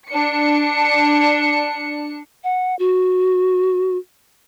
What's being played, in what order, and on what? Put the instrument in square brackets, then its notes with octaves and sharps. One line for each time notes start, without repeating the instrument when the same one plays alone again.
[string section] D4 C#7
[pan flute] F#5
F#4